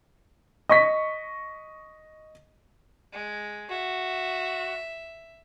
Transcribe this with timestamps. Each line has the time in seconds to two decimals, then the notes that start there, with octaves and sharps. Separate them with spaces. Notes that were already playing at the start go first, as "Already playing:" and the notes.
0.69 D#5 C#6 B6
3.13 G#3
3.71 F#4 E5